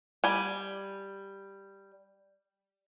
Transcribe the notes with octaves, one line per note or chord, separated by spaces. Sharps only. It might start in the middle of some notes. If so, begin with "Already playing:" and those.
G3 G#5